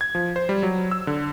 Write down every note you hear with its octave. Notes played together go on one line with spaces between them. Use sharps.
G#6
F3
C5
G3
F#3
E6
D3